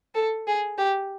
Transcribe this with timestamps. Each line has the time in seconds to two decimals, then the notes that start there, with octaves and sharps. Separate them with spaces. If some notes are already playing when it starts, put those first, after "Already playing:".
0.15 A4
0.47 G#4
0.78 G4